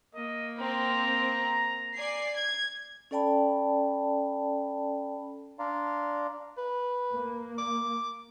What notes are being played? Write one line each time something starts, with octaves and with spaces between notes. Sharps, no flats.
A#3 D#5
C4 A#5
D5 G#5 C7
G#6
C#4 A4 D5 G5 A5 B5
D4 D5 F5 A#5 C6
B4
A#3
D6